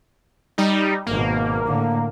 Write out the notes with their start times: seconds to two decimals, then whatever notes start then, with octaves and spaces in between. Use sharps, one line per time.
0.58 G3 D#4
1.07 G#1 B2 A#3
1.66 A2 D3